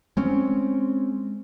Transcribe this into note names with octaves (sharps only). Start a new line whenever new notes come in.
G#3 C4 C#4